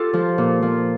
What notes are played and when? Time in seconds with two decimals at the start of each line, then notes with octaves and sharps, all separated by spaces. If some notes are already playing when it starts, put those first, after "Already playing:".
Already playing: F4 G4 A4
0.13 F3
0.38 A#2
0.62 F3